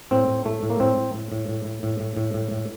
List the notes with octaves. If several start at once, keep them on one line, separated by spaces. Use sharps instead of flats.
A2 C4
A2
A2 A3
A2
A#3
A2 C4
A2
A2
A2
A2
A2
A2
A2
A2
A2
A2